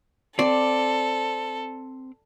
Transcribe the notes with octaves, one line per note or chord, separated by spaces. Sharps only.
C4 A4 D5